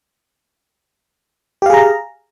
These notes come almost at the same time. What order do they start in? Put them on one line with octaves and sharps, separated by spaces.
G4 F5 G#4 A#5